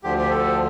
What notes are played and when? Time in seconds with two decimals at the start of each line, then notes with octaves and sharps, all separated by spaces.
0.03 D2 D3 F3 G4
0.18 G4
0.30 A4